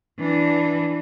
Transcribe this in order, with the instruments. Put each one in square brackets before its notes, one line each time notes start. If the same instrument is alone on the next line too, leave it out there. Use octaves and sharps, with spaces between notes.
[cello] E3 D4